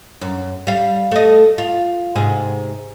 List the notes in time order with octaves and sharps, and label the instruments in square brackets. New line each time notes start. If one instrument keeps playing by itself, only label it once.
[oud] F#2
G3 F5
A3 D#5
F4
G#2 C3 G#4